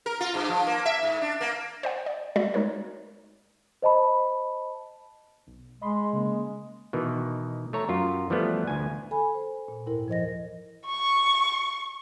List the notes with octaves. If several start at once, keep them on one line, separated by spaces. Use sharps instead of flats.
A#4
F4
G2
F3
A#3
E5
G#2
D4
A#3
C5 D5 F#5
D5
G3 G#3 F#4 D5 E5
G#3 D#4 A#4 C#5
C5 D#5 A5 B5
B1
G#3 D#5 B5 C6
C#3 A#3
B2 D#3 E3
A3 C#5 A#5
F#2 F4
E3 F3 G3 A3 B3
D2 G#5
A4 G#5 B5
C5
A#2
D#2 G#2 E4 A#4
F3 C5 D#5 A#6
C#6